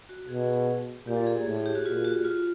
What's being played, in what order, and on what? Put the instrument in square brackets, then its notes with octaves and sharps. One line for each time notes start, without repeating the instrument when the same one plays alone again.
[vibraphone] F#4
[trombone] B2 [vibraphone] G#4
[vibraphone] G#4
[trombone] A#2 [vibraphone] G4
[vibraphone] A4
G#4
[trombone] A2 [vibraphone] G#4
[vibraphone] G#4
G4
F#4
[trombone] A#2 [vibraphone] F4
[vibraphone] F#4
F4